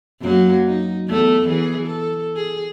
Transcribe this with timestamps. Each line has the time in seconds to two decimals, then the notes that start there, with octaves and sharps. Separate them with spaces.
0.21 F#2 F#3 A#3
0.67 D#4
1.08 E2 A3 A4
1.49 E3 G#4
1.87 A4
2.36 G#4